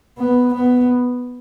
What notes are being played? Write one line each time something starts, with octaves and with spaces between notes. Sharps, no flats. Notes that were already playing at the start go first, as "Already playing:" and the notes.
B3
B3